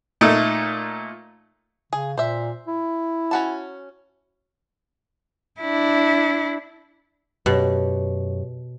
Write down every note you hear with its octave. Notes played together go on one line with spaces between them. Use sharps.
A#2 A3 D#4
C#3 G#4
A#2 C5 E5
E4
C#4 F#4 A5
D4 E4
F#2 B2 G4 C#5